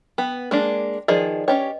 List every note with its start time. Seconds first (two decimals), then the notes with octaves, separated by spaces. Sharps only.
0.18 B3 G5
0.51 G#3 A#3 D4
1.08 D#3 F3 G#4 B4 D5 D#5
1.48 C#4 G4 B4 C#5 D#5 G5